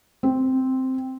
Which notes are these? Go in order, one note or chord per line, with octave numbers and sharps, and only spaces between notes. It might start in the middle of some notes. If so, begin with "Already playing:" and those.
C4